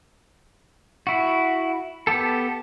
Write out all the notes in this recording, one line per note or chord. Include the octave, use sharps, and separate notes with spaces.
E4 F#4
B3 G4 A4